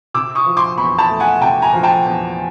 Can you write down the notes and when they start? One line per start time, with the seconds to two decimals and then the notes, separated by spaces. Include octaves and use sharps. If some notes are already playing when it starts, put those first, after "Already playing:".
0.14 C3 D6 E6
0.35 C#6 D#6
0.46 F3
0.57 C6 D6
0.77 E2 B5 C#6
0.98 A5 B5
1.09 A3
1.20 F#5 G#5
1.41 C3 G5 A5
1.62 G#5 A#5
1.73 F3
1.83 G5 A5
2.05 E2